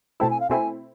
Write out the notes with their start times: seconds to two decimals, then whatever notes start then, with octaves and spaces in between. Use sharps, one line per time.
0.20 B2 A3 C4 E4 A5
0.30 G#5
0.40 F5
0.50 B2 A3 C4 E4 G#5